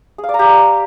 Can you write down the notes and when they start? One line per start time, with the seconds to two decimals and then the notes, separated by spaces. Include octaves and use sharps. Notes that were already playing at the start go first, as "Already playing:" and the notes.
0.18 G#4
0.24 F5
0.29 D5
0.34 A#5
0.39 G4